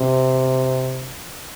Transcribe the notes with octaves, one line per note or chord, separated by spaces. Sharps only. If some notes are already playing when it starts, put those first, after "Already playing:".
Already playing: C3